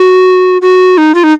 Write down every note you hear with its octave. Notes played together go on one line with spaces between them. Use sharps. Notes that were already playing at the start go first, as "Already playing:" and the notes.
Already playing: F#4
F#4
D#4
F4
D#4